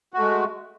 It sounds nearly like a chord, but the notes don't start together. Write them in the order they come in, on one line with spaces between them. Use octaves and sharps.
F#4 A3 G#3